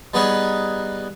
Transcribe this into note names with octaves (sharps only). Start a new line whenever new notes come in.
G3 B3 D#4 G#4 B4 C#5